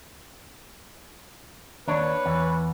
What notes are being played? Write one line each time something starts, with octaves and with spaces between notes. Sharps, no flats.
D#2 D4 B4 C#5
E2